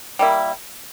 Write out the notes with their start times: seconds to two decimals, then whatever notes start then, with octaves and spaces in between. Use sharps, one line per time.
0.19 G3 A#3 E4